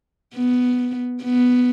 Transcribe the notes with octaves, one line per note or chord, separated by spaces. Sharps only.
B3
B3